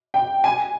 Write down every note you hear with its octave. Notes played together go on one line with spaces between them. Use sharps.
G5
G#5